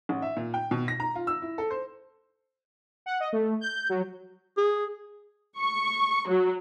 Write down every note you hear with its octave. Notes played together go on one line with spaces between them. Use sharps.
A1
E5
A#2
G5
B2
A#6
A#5
F4
E6
E4
A4
C5
F#5
D#5
A3
G6
F#3
G#4
C#6
F#3